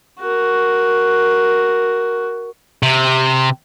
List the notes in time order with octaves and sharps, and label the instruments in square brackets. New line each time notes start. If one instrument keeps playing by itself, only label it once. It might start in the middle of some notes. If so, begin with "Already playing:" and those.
[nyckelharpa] F#4 A#4
[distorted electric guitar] C3